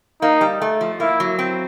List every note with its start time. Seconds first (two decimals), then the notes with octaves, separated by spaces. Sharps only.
0.22 A#3 D#4
0.41 G3
0.62 A3
0.81 F3
1.00 A#3 E4
1.20 F#3
1.39 C4